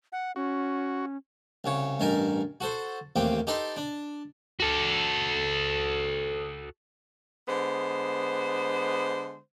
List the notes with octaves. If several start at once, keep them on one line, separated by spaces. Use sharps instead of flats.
F#5
C#4 F#4
C2 C#3 C#5
A1 G2 D#4 A#4 G#5
F#4 A4 C5
A1 D#2 A#3 C4 G4
D#4 G4 A4 B4 D#5 C6
D4
F#4 A4
D3 G#3 B3 C5